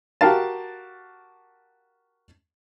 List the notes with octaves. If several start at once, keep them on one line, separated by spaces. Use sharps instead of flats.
F#4 G4 A#4 F5 A5